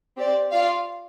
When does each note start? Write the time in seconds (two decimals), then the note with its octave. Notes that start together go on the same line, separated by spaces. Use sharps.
0.17 C4 G4 D5
0.51 F4 D5 F5